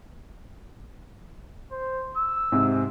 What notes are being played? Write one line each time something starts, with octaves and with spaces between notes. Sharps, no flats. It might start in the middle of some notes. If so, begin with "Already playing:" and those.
C5
E6
G#2 C3